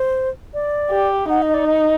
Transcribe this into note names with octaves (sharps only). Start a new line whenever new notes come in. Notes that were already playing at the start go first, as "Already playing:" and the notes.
Already playing: C5
D5
G4
D#4 F#5
D#5
D5
D#5